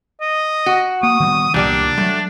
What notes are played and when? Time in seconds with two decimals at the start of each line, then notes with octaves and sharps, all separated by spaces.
0.21 D#5
0.66 F#4
1.03 A#3 D#6
1.20 D#3 G3 B3
1.54 C2 A#2 D#3 F#3 G3 A#3 D4
1.98 F#3 G3 A3